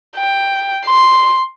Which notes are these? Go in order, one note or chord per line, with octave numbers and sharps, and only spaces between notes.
G5
C6